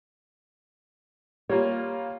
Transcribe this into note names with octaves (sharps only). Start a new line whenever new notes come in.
G3 A#3 F4 C#5